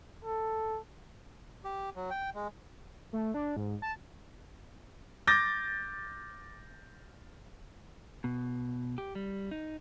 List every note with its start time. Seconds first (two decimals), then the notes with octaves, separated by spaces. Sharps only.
0.24 A4
1.64 G4
1.96 F#3
2.10 G5
2.34 G#3
3.13 A3
3.34 D4
3.57 G#2
3.82 A5
5.27 D6 G6 A6 A#6
8.24 B2
8.98 G4
9.15 G3
9.51 D#4